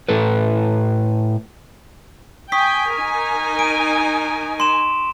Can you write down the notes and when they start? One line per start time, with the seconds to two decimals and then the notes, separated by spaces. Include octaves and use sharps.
0.08 A2 A4 B4
2.52 G5 G#5 C#6 D#6 B6
2.97 D#4 A#4 G#5
3.59 D7 D#7
4.60 C6 E7